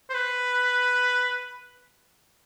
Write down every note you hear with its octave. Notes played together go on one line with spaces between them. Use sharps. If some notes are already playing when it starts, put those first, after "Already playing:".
C5
B4